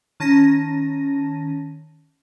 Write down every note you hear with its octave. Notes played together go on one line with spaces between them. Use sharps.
D#3 C#4 A5 A#6 D#7